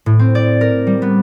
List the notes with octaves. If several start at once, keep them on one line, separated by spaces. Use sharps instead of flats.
A2
C4
D5
A#4
G3
B3